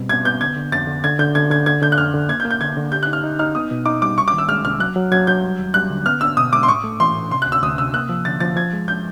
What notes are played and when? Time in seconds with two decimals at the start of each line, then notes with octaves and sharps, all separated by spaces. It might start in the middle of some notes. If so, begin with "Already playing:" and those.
Already playing: B2 G3 C4
0.09 B3 G#6
0.25 B3 G6
0.41 D3 G#6
0.56 D3
0.72 F2 A6
0.87 D3
1.04 D3 G#6
1.19 D3 G6
1.35 D3 G#6
1.50 D3 G#6
1.66 D3 G#6
1.82 D3 G6
1.92 F#6
1.98 F2 F6
2.14 D3
2.29 A#3 G#6
2.40 G6
2.45 A#3
2.50 G6
2.61 D3 G#6
2.77 D3
2.92 G4 G6
3.03 F#6
3.07 D#4
3.13 F6
3.24 D#4
3.39 D#4 F6
3.55 B3 D#6
3.71 B2
3.86 D#4 D6
4.02 G3 D6
4.18 C2 C#6
4.28 D6
4.33 D#3
4.38 E6
4.48 G#3 F6
4.64 C2 F6
4.80 F#3 F#6
4.96 F#3
5.12 F#3 G#6
5.27 F#3 G6
5.43 G3
5.59 D#2
5.74 G3 F#6
5.90 D3
6.06 B3 F6
6.21 D4 E6
6.37 B2 D#6
6.52 G#3 D6
6.63 C6
6.68 A2 C#6
6.84 A3
7.00 E3 C6
7.15 A2
7.31 C3 C6
7.42 F#6
7.46 D2
7.52 E6
7.63 D2 D#6
7.78 C3 E6
7.94 A#3 F#6
8.09 F3
8.25 D3 A6
8.40 F3 A6
8.56 F3 G#6
8.73 G#3
8.88 G6